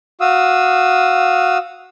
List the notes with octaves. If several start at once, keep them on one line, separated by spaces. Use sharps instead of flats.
F#4 F5 D#6 E6